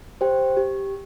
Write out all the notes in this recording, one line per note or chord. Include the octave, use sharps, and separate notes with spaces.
G4 C5 G5
G4